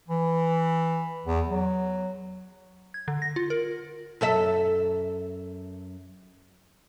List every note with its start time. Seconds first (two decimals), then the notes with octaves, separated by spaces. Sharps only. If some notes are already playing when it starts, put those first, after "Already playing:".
0.08 E3
1.26 E2
1.48 F#3
2.94 G#6
3.08 D3
3.22 A#6
3.36 F4
3.50 A#4
4.21 F#2 A4 E5